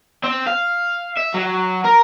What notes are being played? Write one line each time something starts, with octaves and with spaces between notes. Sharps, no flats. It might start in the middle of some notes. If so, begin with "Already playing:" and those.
C4
F5
E5
F#3
A#4